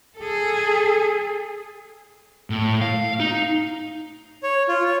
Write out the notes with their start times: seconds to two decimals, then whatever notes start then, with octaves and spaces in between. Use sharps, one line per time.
0.19 G#4 A4
2.50 A2
2.82 F5
3.20 D#4
4.43 C#5
4.68 F4
4.85 C#5